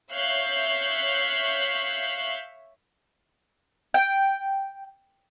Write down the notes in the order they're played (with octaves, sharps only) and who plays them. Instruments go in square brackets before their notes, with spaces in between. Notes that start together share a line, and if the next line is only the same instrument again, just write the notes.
[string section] C#5 E5 F5 F#6 G6 C7
[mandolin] G5